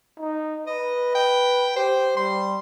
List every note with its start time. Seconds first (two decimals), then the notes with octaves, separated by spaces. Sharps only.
0.19 D#4
0.67 B4 D#5
1.15 G5
1.76 G4 C5
2.17 G3 C6